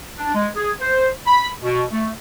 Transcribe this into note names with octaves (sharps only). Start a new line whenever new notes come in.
D4
G#3
G#4
C5
B5
B2
A3